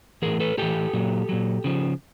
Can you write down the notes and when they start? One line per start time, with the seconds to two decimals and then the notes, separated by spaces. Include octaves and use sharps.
0.22 A2 E3 G#4 A#4
0.40 A4 B4
0.58 A2 E3 G4 A4
0.93 A#2 F#3
1.29 A#2 F#3
1.64 C#3 F3